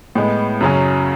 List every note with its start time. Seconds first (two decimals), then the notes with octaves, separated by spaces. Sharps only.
0.15 A2 G#3 B3
0.61 F#2 C#3 F#3 C#4